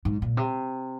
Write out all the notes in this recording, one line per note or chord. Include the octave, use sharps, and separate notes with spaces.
G#2
A#2
C3